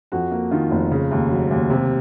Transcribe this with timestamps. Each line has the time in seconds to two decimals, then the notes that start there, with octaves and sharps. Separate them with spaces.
0.12 F2 F#4
0.31 A#3
0.51 D#3 F4
0.71 F1
0.91 C#3
1.11 D#2
1.31 F#3
1.50 D#2
1.70 C3